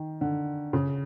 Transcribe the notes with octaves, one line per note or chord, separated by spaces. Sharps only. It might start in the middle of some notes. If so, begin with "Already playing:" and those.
Already playing: D#3
D3
C#3